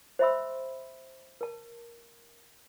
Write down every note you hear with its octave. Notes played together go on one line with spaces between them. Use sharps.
C5 D#5 E5 B5 C6 E6
A#4 A5